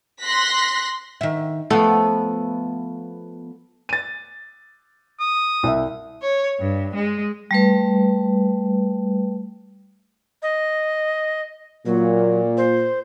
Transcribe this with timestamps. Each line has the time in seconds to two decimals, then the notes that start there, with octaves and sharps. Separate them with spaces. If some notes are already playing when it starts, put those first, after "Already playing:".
0.24 C6 F#6 A#6 B6
1.21 D#3 E5
1.70 F3 A3 B3
3.89 A6 D#7
5.20 D#6
5.63 C2 E5
6.22 C#5
6.59 G2
6.95 G#3
7.51 G3 A3 B4
10.43 D#5
11.86 A#2 F#3
12.57 C5